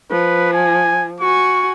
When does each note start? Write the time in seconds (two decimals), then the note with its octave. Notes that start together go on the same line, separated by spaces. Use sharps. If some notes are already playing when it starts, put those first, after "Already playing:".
0.11 F3 B4
0.53 G#5
1.21 F#4 G#5 C#6